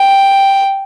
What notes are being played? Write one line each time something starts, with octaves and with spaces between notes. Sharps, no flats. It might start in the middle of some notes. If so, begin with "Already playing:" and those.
Already playing: G5